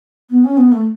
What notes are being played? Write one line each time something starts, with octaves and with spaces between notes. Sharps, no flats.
B3
C#4
B3
A3